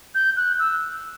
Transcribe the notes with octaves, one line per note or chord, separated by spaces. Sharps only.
G6
F#6
E6